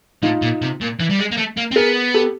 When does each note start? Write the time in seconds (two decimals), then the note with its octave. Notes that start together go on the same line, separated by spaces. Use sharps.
0.22 A2 D#4 F4
0.42 A#2
0.62 C3
0.81 A#2
1.00 E3
1.10 G3
1.19 G#3
1.32 A#3
1.37 A3
1.57 A#3
1.72 C4
1.76 B3 G#4 A#4
2.14 G4 A4